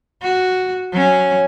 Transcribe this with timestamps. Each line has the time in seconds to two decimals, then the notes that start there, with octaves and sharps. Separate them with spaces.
0.22 F#4
0.92 F#3 C#4